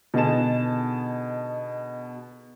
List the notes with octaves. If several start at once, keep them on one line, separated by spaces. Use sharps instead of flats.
B2 D3 D#4 G#4 A5 E7